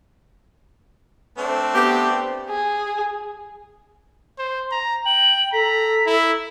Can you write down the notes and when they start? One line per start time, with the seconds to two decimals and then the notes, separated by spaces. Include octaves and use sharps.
1.38 A3 C4 D4
1.74 B3 G4
2.49 G#4
4.39 C5
4.72 A#5
5.06 G5 F#7
5.53 A4 A#5 B6
6.06 E4